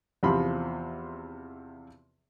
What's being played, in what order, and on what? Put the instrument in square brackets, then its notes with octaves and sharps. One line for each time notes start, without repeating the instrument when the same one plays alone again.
[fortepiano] E2 C3 F3 B5 C6